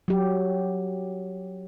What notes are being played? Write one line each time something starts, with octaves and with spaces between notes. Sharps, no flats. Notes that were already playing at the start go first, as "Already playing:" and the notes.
F#3 G4